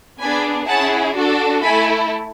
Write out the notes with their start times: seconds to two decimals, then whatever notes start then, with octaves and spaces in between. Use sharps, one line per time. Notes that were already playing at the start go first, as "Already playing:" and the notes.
0.20 B3 D4 G#4 G#5 B5
0.67 C#4 E4 G#4 F#5 A5
1.15 D4 F#4 A4
1.62 A3 E4 A4 G#5 B5